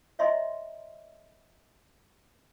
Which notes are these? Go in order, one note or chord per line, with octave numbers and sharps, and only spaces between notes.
C#5 D#5 E5 A#5 C6